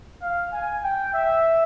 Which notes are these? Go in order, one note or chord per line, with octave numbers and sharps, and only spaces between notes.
F5
G#5
G5
E5